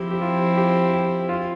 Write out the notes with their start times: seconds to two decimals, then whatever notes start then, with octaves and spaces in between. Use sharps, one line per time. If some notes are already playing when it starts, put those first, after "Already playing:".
Already playing: F3 C4 E4 G4
0.11 G4
0.21 F4
0.57 G4
0.93 G4
1.29 F4